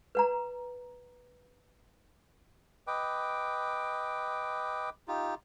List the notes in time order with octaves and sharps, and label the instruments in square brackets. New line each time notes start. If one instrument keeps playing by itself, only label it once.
[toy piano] B4 F#5 A#5
[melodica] B4 D#5 G5 D6
D#4 F4 G4